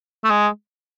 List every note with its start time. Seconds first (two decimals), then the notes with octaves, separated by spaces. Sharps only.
0.24 A3
0.30 G#3